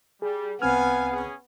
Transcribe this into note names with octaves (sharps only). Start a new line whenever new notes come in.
G3 G#4
C2 B3 C4 F5 G#5 F6
C#4 G#4